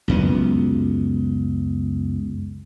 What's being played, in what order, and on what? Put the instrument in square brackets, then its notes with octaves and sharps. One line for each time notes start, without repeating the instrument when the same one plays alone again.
[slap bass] C#2 F#2 B3